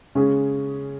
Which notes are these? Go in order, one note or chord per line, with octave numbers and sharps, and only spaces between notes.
C#3 G#3 C#4 G#4